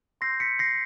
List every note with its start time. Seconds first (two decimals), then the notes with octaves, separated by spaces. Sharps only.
0.21 C6 E6 G6 A#6 C7
0.40 B6 C#7
0.59 A#6 C7